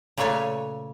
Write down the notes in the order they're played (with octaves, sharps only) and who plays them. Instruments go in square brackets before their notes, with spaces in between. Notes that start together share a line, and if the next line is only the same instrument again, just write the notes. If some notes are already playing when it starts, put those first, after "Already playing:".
[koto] A#2 C#3 A3 B4 C#5 G#5